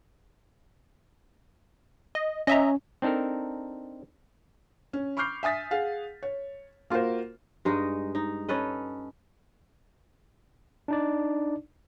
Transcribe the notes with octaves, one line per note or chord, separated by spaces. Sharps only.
D#5
C#4 D#5 E5 A#5
C4 D4 D#4 A4 A#4
C#4
B5 C#6 D6 F6 G6 C7
E5 G#5 D#6 A6 B6
G#4 F5 F#5
C#5
A#3 F4 F#4 A#4 C5
G2 G#3 D#4
D#4
C#4 A4 B4 D#5
D4 D#4 D5